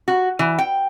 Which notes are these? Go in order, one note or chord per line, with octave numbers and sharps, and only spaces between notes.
F#4
E3
G5